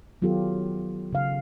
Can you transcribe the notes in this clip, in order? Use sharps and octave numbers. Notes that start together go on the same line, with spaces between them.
D#3 F#3 B3 F4 G4 A4
C#3 F5